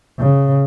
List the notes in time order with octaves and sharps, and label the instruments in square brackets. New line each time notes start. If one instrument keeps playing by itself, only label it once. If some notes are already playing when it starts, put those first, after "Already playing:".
[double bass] C#3